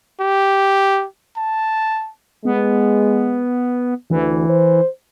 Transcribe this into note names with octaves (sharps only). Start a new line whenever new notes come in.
G4
A5
G#3 B3
D2 E3
C5